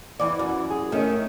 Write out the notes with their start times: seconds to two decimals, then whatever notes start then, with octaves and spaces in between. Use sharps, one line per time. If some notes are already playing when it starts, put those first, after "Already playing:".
0.20 E2 E3 D5
0.39 F#2
0.71 G#4
0.92 D#3 A3 C#4